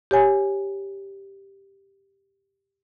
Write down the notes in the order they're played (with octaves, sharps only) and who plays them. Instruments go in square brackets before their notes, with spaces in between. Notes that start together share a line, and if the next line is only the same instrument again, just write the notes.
[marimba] G4 C#5 G#5